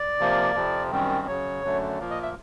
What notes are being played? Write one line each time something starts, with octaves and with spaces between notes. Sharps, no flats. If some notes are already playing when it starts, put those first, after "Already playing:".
Already playing: D5
C3 F3 A#3
F2 C3 F3
F#2 D#3 G3 C4
F#2 C#3 F#3 C#5
F#2 D3 F#3 A3
A#2 F3 A#3
D#5
E5